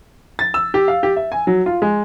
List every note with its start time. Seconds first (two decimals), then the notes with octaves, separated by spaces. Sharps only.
0.39 A6
0.54 E6
0.74 G4
0.88 F5
1.03 G4
1.16 E5
1.32 G#5
1.47 F#3
1.66 F4
1.82 G#3